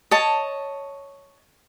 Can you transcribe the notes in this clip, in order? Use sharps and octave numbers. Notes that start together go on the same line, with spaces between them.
C#5 D#5 A5